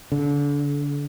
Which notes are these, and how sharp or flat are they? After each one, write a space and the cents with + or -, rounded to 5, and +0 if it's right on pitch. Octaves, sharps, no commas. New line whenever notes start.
D3 -30